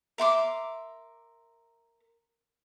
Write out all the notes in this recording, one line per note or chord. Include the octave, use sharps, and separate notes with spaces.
A#4 E5 C6 D6